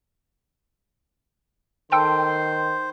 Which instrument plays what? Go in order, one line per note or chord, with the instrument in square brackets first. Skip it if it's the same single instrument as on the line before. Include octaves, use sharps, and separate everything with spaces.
[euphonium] D#3 [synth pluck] A4 G5 A5 [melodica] C5 [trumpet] C6